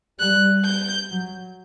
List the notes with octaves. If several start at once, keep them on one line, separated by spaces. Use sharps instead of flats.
G3 F#6
G6
F#3